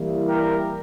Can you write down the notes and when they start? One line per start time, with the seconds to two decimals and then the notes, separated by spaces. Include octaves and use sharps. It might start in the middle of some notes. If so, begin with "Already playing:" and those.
Already playing: E3 G3 A#3 E4
0.27 G4 A#4